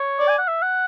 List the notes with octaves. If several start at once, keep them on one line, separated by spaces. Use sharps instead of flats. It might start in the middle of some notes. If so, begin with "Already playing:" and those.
Already playing: C#5
D5
G#5
F#5
E5
F#5